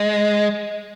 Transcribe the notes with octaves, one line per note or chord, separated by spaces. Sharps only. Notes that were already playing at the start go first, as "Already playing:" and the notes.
Already playing: G#3